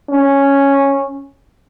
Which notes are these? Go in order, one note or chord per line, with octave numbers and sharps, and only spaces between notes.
C#4